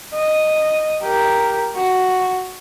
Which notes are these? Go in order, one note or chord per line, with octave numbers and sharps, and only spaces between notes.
D#5
G4 A#4
F#4